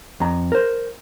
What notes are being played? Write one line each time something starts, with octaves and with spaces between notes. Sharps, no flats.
F2 A#5
A#4 C5